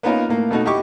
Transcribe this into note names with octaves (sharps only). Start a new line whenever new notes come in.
A#3 B3 C#4 D#4 F4 A#4
A2 A#3
B2 A3 D#4 F#4
E4 G4 D#5 G5 C#6 D6